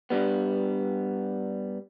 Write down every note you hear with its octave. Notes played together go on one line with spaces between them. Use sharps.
G2 G3 B3